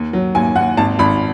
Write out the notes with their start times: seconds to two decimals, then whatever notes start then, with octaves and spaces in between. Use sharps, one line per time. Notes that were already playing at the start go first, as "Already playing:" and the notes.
Already playing: D#2
0.13 F#3
0.35 D#2 G#5
0.56 D#2 F#5
0.77 G#1 A5
0.99 G#1 B5